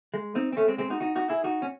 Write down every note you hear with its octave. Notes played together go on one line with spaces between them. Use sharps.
G#3
C4 D#4
C4
A3 C#4
G#3 C4
G#3 C4
D#4 F#4
D#4 F#4
D#4 F#4
E4 G#4
D#4 F#4
C#4